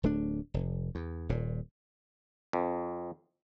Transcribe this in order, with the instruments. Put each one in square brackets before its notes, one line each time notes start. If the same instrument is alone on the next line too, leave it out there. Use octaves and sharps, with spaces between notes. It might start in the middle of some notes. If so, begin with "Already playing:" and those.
[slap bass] D1 A3 D4
F1
E2
D#1 A#2
[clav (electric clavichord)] F2